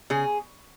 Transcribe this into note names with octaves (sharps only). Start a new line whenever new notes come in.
C#3 G#4